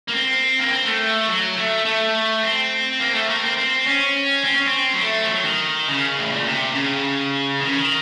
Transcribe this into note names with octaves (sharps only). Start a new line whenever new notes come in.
A#3
C4
A#3
C4
A3
F#3
A3
A3
C4
A#3
A3
A#3
C4
C4
C#4
C4
C#4
C4
F#3
A3
F3
F#3
D#3
C#3
A2
A#2
C3
C#3
D#3
C#3
D#3